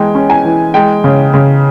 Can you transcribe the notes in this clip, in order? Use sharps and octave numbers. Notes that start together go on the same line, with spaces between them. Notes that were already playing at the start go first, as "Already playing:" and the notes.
Already playing: E3 G#3 G5 G#5
C#4
G#5
E3
G#3 G5
C#3
C#3